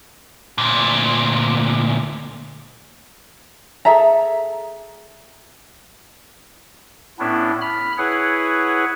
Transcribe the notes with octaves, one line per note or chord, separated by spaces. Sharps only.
D2 A#2
G#4 A4 E5 A#5
A2 B3 C#4 D4 E4
B5 F6
E4 G#4 B4 C#5 F#5